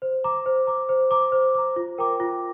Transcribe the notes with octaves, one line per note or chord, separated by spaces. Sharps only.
C5
A#5 D6
C5
A#5 D6
C5
A#5 D6
C5
A#5 D6
F4
A#4 G5 A#5 D6
F4